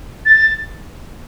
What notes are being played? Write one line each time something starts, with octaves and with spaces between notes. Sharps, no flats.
A6